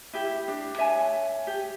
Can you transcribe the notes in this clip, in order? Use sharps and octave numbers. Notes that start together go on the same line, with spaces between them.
E4 G4
D4
C#5 E5 G#5 A5
G4